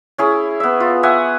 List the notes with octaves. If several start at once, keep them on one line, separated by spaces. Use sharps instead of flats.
C#4 E4 G#4
B3 E5
F4
E5 F#5 G#5 D#6